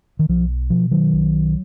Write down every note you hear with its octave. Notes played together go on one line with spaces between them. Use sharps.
D#3
B1 F3
B2 F3
D#3 F#3
B1